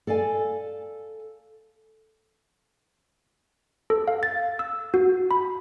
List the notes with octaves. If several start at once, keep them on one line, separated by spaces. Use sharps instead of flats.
A4 D5 F5 G#5
A4
F5
A6
E6
F#4
B5